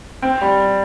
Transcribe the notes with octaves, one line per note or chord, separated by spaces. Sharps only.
C4
G3